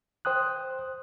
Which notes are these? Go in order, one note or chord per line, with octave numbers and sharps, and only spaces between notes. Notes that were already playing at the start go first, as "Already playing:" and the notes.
C5 G5 D#6 F#6